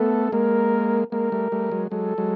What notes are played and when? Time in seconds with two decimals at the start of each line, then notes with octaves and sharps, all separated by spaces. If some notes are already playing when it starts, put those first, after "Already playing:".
Already playing: A3 B3 A4
0.32 G#3 A#3 A#4
1.12 G#3 A#3 A#4
1.32 G3 A3
1.52 G3 A3
1.71 F#3 G#3
1.91 F#3 G#3 A4
2.18 F#3 G#3